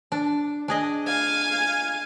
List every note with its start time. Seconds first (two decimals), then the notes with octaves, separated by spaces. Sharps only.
0.12 D4
0.68 D4 G#4 D#5
1.07 F5 G#5